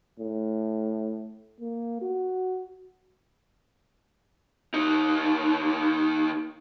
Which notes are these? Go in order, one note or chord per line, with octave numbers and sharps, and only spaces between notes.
A2
A#3
F#4
D#2 D#4